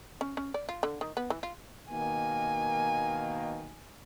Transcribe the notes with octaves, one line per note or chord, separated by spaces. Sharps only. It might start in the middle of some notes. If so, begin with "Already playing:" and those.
C#4
C#4
D5
F4
D3
D#3
B3
E3
F4
B2 D#3 A#3 G#5